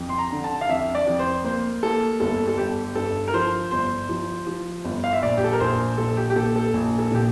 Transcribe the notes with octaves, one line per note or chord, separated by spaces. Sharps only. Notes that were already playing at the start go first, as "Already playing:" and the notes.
Already playing: F2
C6
A#5
D3
A5
F5
F2 E5
D5
F2
C5
A#3 C5
A#3 A4
G1 A4
A4
G1 G4
G2 A4
A#4
F3 C5
G1 C5
F3
F3
G1
F5
E5
A#1 D5
G4
A4
A#4
A#1 C5
A#1 A4
G4
G4
A#2 A4
A4
A#1
A4
A#2 G4